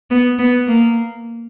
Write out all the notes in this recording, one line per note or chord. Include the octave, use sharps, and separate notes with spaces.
B3
B3
A#3